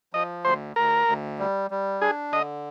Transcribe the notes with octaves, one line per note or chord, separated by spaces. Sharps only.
F3 D#5
D2 C5
D2 A#4
D2
G3
G3
D4 G#4
D3 D#5